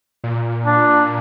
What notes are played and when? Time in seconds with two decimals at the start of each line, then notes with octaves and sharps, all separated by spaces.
0.24 A#2
0.66 D4